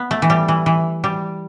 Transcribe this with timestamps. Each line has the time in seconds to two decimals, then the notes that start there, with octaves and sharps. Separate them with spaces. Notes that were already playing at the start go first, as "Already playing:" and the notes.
Already playing: B3
0.11 A3
0.22 E3
0.30 G3
0.48 E3
0.66 E3
1.04 G3